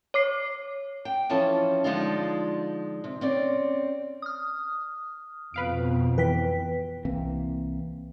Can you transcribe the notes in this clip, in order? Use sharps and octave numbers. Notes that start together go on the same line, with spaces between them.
C#5 D6 C7
G5
E3 F3 C#4 A4 A5
D3 F3 G#3 D4 D#4 F4
C3
C4 C#4 D5
D#6 F6
F2 B2 B4 F5 D7
E3 B4 G5 B6
C2 E3 A#3 C4